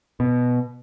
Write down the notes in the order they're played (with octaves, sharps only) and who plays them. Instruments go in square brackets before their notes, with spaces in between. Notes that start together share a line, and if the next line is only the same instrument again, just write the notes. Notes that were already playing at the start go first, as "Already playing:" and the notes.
[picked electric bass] B2